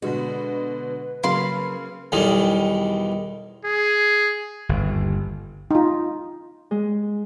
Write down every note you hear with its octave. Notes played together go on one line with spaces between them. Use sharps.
B2 D3 G#3 F#4 B4
C#3 F#3 A#3 F5 B5 C6
B1 E2 D#3 G3
G#4
G1 D#2
D#4 F4
G#3